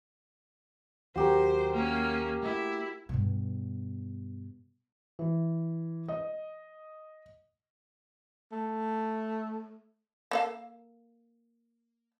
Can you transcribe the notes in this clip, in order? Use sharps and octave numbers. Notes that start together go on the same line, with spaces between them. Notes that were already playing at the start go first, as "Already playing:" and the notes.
D#2 F#3 F#4 G4 A#4 C5
A#3 C#4
A3 E4
G2 B2
E3
D#5
A3
A#3 A4 F5